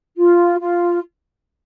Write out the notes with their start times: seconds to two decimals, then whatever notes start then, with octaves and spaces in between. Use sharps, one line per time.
0.17 F4
0.60 F4